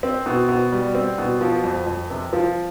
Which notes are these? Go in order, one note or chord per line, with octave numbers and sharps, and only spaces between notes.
C4
B2
B2
G3
C4
B2
F3
F2
F2
C3
F3